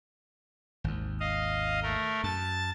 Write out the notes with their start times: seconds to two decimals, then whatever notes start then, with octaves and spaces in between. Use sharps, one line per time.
0.84 G#1 D#2
1.20 D#5 F5
1.83 A3 A#4
2.24 F#2 A5 A6